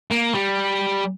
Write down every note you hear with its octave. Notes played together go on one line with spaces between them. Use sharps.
A#3
G3